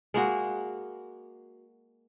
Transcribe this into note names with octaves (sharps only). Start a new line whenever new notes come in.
G#3 A#3 F#4